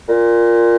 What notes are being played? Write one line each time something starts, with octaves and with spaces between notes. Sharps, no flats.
A#2